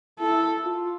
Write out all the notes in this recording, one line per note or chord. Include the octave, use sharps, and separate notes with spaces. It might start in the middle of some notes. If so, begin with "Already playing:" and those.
E4 A4
F4